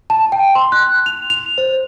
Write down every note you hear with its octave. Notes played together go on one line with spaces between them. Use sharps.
A5
G5
C6
F#6
F7
F7
C5